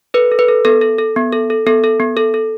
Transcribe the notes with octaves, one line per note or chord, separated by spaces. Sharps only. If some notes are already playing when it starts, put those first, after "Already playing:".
A4 B4
A4
B4
A4
B3 A4
A4
A4
B3
A4
A4
B3 A4
A4
B3
A4
A4